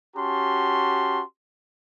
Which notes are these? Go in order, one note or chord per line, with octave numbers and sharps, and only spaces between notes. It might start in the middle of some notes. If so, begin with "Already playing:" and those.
C#4 F#4 G4 A5 C6